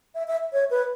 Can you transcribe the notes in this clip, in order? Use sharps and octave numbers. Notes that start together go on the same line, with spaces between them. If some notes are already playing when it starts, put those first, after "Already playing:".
E5
E5
C#5
B4